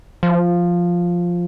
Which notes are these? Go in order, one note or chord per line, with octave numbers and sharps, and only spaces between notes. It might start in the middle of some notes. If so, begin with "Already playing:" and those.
F3